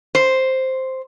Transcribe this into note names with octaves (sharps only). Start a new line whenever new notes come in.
C5